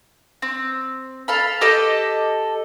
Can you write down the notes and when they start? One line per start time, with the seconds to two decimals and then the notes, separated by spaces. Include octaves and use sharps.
0.42 C4
1.28 A4 F5 B5
1.61 G4 A4 D#5 D6